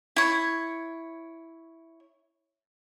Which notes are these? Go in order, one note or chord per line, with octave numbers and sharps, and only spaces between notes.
E4 C#5